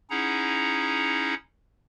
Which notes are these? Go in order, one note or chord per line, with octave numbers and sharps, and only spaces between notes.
C#4 D#4 E4 G#4 F#5 A#5